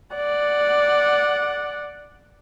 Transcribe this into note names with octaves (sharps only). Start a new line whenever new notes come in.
D5 F#5